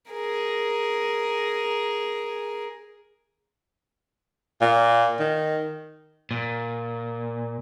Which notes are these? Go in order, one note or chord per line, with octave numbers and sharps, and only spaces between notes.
G#4 A#4
A#2
D#3
A#2